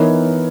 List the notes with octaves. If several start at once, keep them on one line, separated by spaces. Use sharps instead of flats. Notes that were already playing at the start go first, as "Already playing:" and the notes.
Already playing: E3 B3 D#4 A#4 C#5